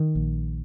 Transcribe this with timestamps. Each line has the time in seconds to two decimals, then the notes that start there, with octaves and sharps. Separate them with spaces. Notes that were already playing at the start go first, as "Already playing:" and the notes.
Already playing: D#3
0.15 A#1